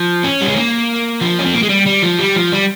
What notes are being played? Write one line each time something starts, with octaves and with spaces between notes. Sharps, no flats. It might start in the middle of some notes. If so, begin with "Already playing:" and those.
Already playing: F3
C#4
G3
G#3
A#3
F3
C#4
C4
A#3
G#3
G3
G3
F3
G3
F3
G3